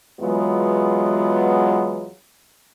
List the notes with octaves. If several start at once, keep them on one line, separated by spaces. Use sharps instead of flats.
E2 F#3 G#3 B3 F4